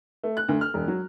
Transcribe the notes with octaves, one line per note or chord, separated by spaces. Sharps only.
A3
F#6
D2
F6
E1
F#3